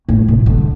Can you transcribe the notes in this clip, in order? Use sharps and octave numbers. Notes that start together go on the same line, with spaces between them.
A2
C3
D3